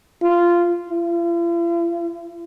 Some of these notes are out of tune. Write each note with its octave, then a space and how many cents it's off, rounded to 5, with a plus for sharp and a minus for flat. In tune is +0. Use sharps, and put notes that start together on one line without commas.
F4 -15
F4 -45